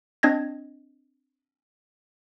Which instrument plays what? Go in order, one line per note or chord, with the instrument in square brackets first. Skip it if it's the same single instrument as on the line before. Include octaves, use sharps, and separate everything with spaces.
[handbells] C4 D4 D#5 G#6 A#6